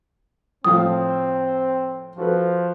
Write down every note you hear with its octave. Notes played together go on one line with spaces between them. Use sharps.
A2 F3 C4 F5 D#6
F3 F#4 A4 B4